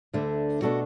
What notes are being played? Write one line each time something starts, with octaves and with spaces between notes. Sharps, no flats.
D2 D3 A3 D4
B2 A3 D4 F#4 A4